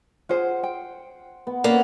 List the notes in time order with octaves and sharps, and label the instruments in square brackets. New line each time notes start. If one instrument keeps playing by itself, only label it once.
[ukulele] F4 G#4 C5 [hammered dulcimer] F#5 C6
[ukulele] G5
[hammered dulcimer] B3
[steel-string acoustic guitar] A#3 B3 [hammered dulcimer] C#4 F#5 [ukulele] D5